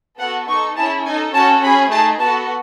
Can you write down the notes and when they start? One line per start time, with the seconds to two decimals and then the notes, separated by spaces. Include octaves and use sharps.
0.20 B3 F#4 A4 F#5
0.49 D#4 A4 C#6
0.77 C#4 E4 G#4 A5
1.06 D#4 A4 G#5
1.34 C#4 F#4 A4 A5
1.63 C#4 G#4 B5
1.91 A3 D#4 G#4 A5
2.19 B3 F#4 A4 A5